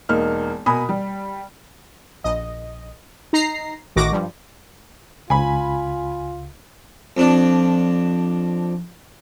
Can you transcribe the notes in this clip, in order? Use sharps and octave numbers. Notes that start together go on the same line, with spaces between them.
E1 A#3 D#4 F6
B2 A#4 G#5 B5 D#6
G3
A#1 D#5
D#4 A#5 C7
A1 A2 D#3 F#4 D6 A#6
G2 F3 G3
C#2 F4 G#5 B5
F2 D4